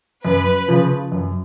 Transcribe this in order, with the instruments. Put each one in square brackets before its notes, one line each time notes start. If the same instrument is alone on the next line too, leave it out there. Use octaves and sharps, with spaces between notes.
[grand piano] F#2 [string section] B4
[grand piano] C#3 F3
F#2